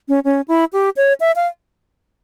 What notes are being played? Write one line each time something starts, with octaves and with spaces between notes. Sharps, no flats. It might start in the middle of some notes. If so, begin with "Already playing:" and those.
C#4
C#4
E4
G4
C#5
E5
F5